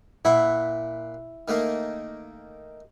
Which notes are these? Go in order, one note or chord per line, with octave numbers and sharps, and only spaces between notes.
A#2 E4 F#5 B5
D#3 A3 A#3